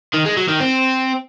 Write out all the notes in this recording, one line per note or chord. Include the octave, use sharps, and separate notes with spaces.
D#3
G#3
F#3
D#3
C4